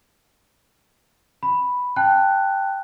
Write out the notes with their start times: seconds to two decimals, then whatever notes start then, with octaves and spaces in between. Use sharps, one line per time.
1.43 B5
1.96 G5 A5 F#6